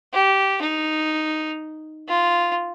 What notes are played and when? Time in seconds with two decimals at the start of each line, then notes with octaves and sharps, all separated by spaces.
0.13 G4
0.61 D#4
2.08 F4